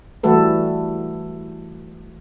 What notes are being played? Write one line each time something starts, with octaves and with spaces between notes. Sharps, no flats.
E3 G3 A3 F#4 A4 B4